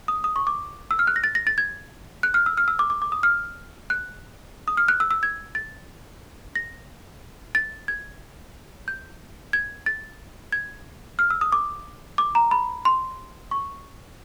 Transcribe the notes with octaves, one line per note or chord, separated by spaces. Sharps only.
D#6
D#6
C#6
D6
E6
F6
F#6
A#6
A6
A#6
A6
G#6
F#6
F6
E6
F6
E6
D6
D6
D6
D#6
F6
F#6
D#6
F6
F#6
E6
E6
G#6
A6
A#6
A6
G#6
G6
G#6
A6
G#6
F6
E6
D#6
D6
D6
A#5
B5
C6
C#6